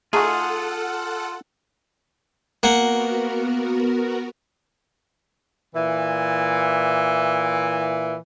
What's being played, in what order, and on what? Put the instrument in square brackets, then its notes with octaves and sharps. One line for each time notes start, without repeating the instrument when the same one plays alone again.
[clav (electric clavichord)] A3 D#4 F#4 [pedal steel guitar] F4 [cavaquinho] G#4 [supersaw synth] A4 F#5
[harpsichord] A#3 F#5 [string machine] B3 F#4 A#4
[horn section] A#2 E3